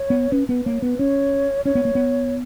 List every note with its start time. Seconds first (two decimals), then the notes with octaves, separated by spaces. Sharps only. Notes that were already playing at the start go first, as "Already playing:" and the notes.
Already playing: C#5
0.10 B3
0.32 C#4 B4
0.49 B3 B4
0.66 A#3 C#5
0.82 B3 B4
0.99 C#4 C#5
1.65 C#4 C#5
1.75 B3
1.85 A#3
1.95 B3